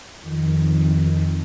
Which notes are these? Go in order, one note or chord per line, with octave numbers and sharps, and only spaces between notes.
F2 D#3